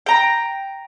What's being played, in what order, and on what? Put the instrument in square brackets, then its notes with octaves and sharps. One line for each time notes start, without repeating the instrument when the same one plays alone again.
[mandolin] G5 A#5